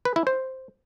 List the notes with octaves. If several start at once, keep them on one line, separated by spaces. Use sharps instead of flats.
B4
E4
C5